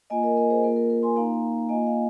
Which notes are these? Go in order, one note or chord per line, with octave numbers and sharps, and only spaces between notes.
A#3 F4 D#5 G#5
A#4 D#5
A#4 D#5
G#4 C5
A#3 F4 A#4
A#4
A#4
G#5 C6
A#3 D#4 F5 A#5
F5
A#3 F4 D#5 G#5
F5